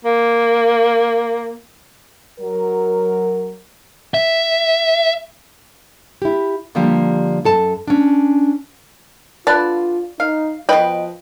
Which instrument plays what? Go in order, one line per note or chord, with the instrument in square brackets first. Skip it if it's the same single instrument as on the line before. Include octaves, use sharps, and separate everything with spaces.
[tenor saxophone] A#3
[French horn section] F#3 A#4
[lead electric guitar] E5
[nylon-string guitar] E4 G4
D3 F3 G3 A#3 G4
F#2 A4 A5
C#4 D4
[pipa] D3 B4 A5 [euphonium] F4 [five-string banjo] D5
[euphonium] D#4 [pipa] F5
[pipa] B2 G5 [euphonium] F3 [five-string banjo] B4 D#5